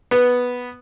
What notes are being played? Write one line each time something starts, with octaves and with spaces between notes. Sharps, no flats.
B3